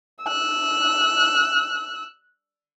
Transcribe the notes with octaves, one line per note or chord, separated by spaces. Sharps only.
E6 F#6